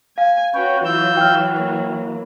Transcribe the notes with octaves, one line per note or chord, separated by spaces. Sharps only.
F5 G#5
C#4 F#4 B4 C#5 G5
E3 F#3 F4 E6 G6
G5 F6
A#3